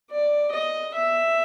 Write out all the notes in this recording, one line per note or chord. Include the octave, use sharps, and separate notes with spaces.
D5
D#5
E5